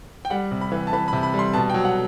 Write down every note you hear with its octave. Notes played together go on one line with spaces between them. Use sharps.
G5
G3 F#5
C3
B5
E3
A5
E3 B5
B5
C3
B5
G3
C6
B2 A5
G5
F#3
F#5